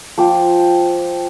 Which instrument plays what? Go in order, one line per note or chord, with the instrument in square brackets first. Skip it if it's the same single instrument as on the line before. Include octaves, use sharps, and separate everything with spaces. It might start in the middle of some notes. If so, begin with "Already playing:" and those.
[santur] F3 G5 D6